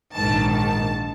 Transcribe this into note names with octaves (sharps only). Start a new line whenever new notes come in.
A#1 G#2 D#3 A5
A5